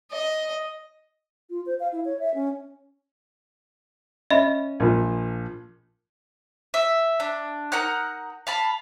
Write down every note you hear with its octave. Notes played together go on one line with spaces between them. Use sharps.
D#5
F4
C5
F5
E4
C#5
E5
C#4
C#4 D#5 E5 B5
A#1 F3
E5
D4
D#4 A#4 F#5 F#6
F5 A5 B5